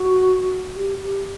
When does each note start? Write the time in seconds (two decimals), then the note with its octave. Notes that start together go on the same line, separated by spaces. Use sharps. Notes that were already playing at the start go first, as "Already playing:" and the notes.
Already playing: F#4
0.76 G4
1.01 G4